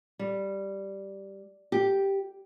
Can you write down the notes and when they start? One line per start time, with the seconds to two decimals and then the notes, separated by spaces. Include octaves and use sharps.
0.19 G3
1.72 G4